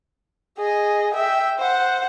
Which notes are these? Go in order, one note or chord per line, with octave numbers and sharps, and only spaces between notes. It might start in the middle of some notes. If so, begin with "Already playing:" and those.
G#4 D#5
E5 G5
C5 F#5